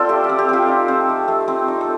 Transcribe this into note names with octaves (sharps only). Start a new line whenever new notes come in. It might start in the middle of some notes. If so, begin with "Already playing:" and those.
Already playing: C4 F4 A4 C5 D5
A3 G4
G4
C4
G4
C4 F4 A4
D#4
C4
A3
A3
C4
D#4
A4